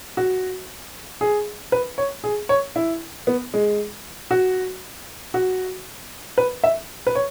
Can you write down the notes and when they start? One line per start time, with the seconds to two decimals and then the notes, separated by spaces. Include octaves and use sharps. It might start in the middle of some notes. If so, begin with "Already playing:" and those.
0.17 F#4
1.21 G#4
1.72 B4
1.98 C#5
2.24 G#4
2.49 C#5
2.76 E4
3.27 B3
3.54 G#3
4.31 F#4
5.34 F#4
6.38 B4
6.64 E5
7.07 B4
7.15 C#5